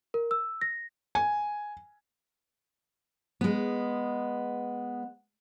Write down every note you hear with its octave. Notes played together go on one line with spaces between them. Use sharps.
A#4
E6
A#6
G#5
G#3 B3